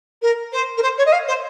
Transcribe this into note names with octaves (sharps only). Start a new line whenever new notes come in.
A#4
C5
A#4
C5
C#5
D#5
F5
C5